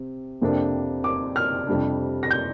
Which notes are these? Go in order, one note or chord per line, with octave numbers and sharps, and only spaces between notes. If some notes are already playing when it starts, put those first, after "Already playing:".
Already playing: C3
F2 C3 A#3 D4
D6
F6
F2 C3 G3 D4
A#6
G6